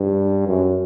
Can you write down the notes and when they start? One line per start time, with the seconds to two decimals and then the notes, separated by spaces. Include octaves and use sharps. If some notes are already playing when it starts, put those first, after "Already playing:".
Already playing: G2
0.48 F#2